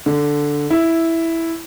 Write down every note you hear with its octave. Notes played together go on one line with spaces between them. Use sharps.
D3
E4